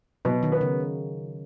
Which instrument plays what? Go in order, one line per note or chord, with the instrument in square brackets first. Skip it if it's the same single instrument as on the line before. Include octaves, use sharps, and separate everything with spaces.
[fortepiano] B2 [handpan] F#3
[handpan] D#3
[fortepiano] B3
[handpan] C#3